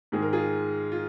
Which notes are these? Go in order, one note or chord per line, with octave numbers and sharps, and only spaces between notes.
G#2 D#3 G#3 G#4
A#4
F4 G#4
F4